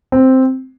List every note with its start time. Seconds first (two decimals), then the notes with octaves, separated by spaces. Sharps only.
0.12 C4